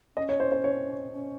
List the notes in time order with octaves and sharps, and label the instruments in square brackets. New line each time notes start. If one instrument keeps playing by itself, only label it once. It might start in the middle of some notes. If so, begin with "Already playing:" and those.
[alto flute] C#4 [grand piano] D#5
[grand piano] C#5
C5
C5
C#5
[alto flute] C#4